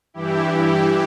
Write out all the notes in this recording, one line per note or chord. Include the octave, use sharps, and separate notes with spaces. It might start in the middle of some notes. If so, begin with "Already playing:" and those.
G2 E3 E4 G4